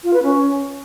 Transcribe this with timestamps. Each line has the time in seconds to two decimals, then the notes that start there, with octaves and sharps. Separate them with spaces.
0.04 F4
0.13 B4
0.23 C#4